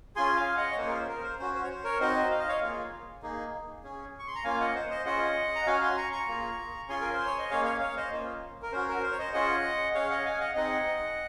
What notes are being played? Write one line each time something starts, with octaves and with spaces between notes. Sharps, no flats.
C#4 F4 G#4 G#5 C6
F5 G#5
D#5 F#5
C#5
A#3 C#4 F4 G#4 C5
A#4
C5
A#4
C5
C#4 F#4 C5
C5
C#5
C5
A#4 C#5
C4 D#4 F#4 C5 D#5
F5
D#5
C#5 F5
A#3 F4 G#4
A#3 D#4 G#4
C#4 G#4
C#6
C6
A#5
A#3 C#4 F4 F5 G#5
D#5 F#5
C5
C5 D#5
C#4 F4 G#4 D#5 F#5
A#5
C#4 F#4 F5 G#5
G#5 C6
A#5 C#6
A#5 C#6
A#3 F4 G#4
C#4 F4 G#4 G#5 C6
A#4
C5
C#5
D#5
A#3 C#4 G#4 C#5 F5
C#5 F5
C#5 F5
C5 D#5
A#3 C#4 F4
A#4
C#4 F#4 C5
A#4
C5
C#5
C5 D#5
C#4 F4 G#4 D#5 F#5
C#4 G#4 C#5 F5
D#5 F#5
F5 G#5
D#5 F#5
C4 D#4 G#4 D#5 F#5